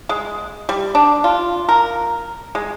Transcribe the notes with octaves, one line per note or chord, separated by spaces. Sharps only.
G#3
G3
D4
F4
A#4
G#3